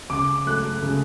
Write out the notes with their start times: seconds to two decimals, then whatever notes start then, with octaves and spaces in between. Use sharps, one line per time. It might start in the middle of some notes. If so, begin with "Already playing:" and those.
0.10 C#3 D6
0.46 F#3 A3 F#6
0.83 C#3